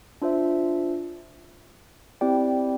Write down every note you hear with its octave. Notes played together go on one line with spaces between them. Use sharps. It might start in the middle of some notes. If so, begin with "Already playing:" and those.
D4 F4 C5 E5
C4 E4 G4 D5 G5